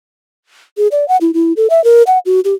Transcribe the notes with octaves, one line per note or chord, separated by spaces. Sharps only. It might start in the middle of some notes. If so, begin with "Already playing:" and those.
G#4
D5
F#5
E4
E4
A4
E5
A#4
F#5
F#4
G4